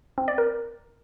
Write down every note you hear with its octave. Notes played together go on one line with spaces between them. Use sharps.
C4
D5
A#4